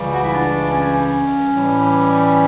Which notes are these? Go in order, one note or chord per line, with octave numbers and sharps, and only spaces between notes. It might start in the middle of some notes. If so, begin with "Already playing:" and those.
Already playing: C#2 C#3 E3 G3
F#4
E4
D4
C#4
A2 E3 G3